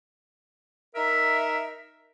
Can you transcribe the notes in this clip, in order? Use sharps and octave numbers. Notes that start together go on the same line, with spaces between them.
D#4 A#4 E5